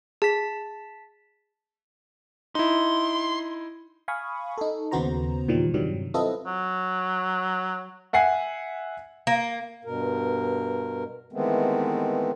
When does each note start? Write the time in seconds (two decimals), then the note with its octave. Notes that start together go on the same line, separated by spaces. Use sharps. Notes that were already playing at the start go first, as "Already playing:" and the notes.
0.22 G#4 A5 B6
2.55 D#4 E4 C6
4.08 F5 G#5 B5 C#6 D#6
4.58 D#4 A4
4.91 D#2 C#3 B3 F#4 C5 A#5
5.48 E2 A#2 D#3 F3 G3
5.74 G2 C3 D#3 F#3 G3
6.14 C4 E4 F4 A4 B4 D#5
6.46 F#3
8.13 E5 F#5 G#5 C7
9.27 A#3
9.85 G2 B2 A#4
11.33 D#3 E3 G#3 A3 B3 C4